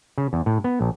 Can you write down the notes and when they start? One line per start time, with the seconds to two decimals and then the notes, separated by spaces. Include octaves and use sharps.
0.18 C#3
0.33 E2
0.46 A2
0.64 B3
0.81 A#1